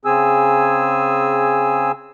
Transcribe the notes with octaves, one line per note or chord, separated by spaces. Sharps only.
C#3 C4 G#4 G#5 E6